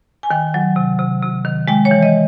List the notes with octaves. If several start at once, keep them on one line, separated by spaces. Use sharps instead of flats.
G#5
D#3 G5
F#3
C3
C3
C3
D#3
G#3 G5
C#5
E3
D#5